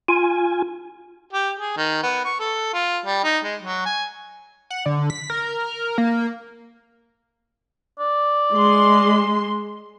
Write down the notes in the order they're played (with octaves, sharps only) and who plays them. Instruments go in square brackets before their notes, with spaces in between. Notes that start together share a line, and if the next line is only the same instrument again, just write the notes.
[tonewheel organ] F4 G#5
[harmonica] G4
G#4
D#3
B3
C#6
A4
F4
G3
D#4
G#3
F#3
G#5
[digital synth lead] F#5
D3
B6
A#4
A#3
[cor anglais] D5
[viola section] G#3 C6